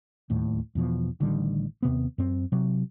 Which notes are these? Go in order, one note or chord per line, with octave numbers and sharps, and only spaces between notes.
D1 D#2 A2
E2 B2 F3
A1 D3 D#3 G3
D#2 C3 B3
F#2 C4
C3 F#3